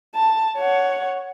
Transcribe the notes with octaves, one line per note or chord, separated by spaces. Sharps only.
A5
C#5 F#5